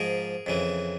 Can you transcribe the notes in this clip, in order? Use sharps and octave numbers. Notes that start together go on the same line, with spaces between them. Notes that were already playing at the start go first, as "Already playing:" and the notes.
Already playing: G#2 F3 G#4 A#4
F2 C#3 E3